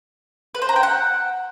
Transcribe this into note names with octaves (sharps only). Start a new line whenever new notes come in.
B4
C5
A#5
G5
F#5